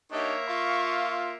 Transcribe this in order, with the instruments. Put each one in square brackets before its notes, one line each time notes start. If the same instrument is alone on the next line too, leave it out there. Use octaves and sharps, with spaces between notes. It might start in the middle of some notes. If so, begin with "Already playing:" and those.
[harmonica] A#3 E5 [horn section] D4 D#4 G4 [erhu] C#5
[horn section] F4 [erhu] C#6